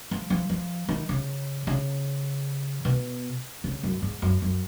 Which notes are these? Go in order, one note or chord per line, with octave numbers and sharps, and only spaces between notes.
F3
F3
F3
D#3
C#3
C#3
B2
C#3
F#2
G#2
F#2
F#2